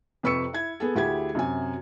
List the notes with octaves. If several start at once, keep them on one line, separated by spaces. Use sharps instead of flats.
F2 C3 B4 C#6 E6 C#7
E4 G#6
B3 G#4 A4
D2 E4 G4 G#4 G#6
F#2 C3 G#5